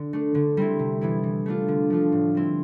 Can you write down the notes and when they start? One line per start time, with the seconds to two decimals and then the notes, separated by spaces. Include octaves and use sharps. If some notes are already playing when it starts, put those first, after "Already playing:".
Already playing: D3
0.13 A3 D4
0.35 D3
0.57 G3 C4 E4
0.79 C3
1.01 E3 B3 E4
1.23 E3
1.46 A3 D4 F4
1.68 D3
1.90 F3 A3 D4 F4
2.12 A2
2.35 G3 C4 E4